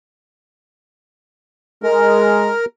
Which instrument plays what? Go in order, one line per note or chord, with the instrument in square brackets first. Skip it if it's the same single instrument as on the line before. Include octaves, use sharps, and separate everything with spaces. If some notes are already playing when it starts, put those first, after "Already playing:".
[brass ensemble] G#3 [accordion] A#4